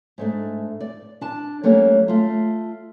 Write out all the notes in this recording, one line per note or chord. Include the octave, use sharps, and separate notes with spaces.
G#2 A3 D4
D5
D4 A5
F#3 G3 A3 A#3 C#4
A3 F4